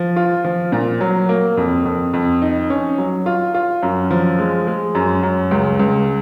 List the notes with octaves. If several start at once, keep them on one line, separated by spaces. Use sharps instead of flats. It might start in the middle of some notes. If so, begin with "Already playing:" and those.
Already playing: F3
F4
F3
A#2
F#3
A#3
F2
F2
F2
D#4
C#4
F#3
F4
F4
F#2
F3
G#3
G#3
F#2
F#2
C#2
C#2